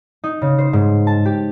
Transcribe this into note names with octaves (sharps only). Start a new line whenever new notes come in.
D#4
C#3
C5
G#2
A5
G4